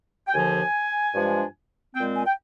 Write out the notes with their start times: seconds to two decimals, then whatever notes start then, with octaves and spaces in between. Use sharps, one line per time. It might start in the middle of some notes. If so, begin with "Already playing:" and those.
0.27 G5
0.33 D#2 D3 F3 G#5
1.14 G2 F3 G#3 D4
1.95 A#2 G#3 C4 G5
2.16 G#5
2.26 G5